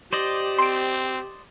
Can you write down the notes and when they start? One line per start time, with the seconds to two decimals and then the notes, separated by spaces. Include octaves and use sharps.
0.13 G4 C5 D5 D#5
0.58 C4 C6 D7